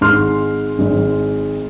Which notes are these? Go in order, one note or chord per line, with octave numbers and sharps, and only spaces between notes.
G#1 G#2 G#3 C6 F6
G#1 G#2 G#3